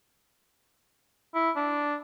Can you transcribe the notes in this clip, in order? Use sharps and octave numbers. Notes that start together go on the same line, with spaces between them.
E4
D4